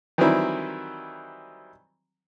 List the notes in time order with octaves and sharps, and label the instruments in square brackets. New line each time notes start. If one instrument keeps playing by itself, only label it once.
[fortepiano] D#3 E3 F#3 G3 C4 E4